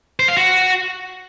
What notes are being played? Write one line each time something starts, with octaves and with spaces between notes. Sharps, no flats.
C5
F5
F#4